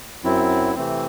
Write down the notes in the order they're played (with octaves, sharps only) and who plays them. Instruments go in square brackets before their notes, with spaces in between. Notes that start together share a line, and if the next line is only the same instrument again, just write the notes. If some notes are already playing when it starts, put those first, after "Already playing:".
[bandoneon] F#2 F#3 C4 E4
C3 E3 A3 C4